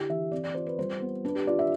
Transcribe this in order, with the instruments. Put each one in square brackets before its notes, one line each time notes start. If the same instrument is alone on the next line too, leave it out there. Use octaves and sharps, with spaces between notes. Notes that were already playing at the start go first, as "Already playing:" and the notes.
Already playing: [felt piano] D3 E4 G4
E3 E5
C4 D5
D5
F4 C5
B4
G3 C5
B3
D4 B4
G4
F4 D5
E5